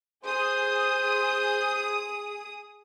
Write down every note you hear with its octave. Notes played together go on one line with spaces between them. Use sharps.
G#4 C5 D#6